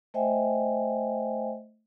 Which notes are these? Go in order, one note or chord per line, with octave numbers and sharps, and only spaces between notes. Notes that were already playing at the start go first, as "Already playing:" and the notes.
A3 C5 D#5 E5 G5 G#5